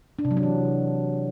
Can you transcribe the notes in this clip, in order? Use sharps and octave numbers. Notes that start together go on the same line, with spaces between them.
D4
C3
F#3
D4
E3